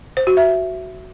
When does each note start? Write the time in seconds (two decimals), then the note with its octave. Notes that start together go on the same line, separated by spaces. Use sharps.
0.17 C5
0.27 F#4
0.37 E5